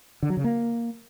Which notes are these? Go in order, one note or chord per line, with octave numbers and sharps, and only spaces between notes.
D3
F#3
C#3
A#3